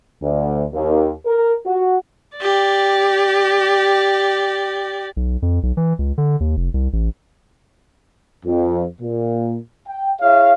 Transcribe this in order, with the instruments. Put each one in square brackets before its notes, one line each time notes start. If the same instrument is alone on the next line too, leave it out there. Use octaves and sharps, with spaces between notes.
[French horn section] D2
D#2
A#4
F#4
[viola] G4 D5
[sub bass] B1
F2
B1
E3
C#2
D3
D#2
F1
C2
A1
[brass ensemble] F2
A#2
G5
E4 G#4 C#5 E5 F5